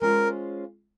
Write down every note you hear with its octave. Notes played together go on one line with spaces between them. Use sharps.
G#3 C#4 F4 A#4 C5